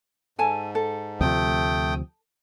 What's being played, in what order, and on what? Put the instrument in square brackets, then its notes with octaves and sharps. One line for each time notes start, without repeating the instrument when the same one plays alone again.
[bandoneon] G#2 [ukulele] A4 G#5 A5
[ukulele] A4
[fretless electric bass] D2 C3 F3 [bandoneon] A3 G5 D#6